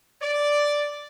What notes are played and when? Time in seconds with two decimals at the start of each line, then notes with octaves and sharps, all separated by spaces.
0.21 D5